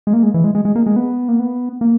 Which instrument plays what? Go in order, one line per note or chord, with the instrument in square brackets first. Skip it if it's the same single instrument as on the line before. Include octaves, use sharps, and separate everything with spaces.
[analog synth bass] G#3
A#3
G#3
E3
G#3
G#3
G#3
A#3
G#3
B3
A#3
B3
A#3